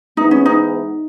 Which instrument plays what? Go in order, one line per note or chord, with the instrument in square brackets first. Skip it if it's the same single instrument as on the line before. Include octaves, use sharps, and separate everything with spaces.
[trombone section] G#2 E3 B3 [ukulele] D#4
[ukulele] C#4
D#4